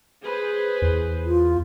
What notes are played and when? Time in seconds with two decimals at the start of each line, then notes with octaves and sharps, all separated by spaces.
0.24 G#4 B4 C5
0.82 E2
1.26 F4